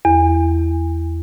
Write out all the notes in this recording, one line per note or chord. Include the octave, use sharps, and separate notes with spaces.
E2